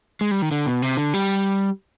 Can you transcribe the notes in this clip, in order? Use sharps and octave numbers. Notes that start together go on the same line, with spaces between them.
G#3
G3
D#3
D3
B2
C3
D3
G3